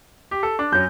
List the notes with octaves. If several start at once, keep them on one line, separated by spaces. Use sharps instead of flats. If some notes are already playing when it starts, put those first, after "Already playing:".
G4
A4
D4
F#2 F#3 G6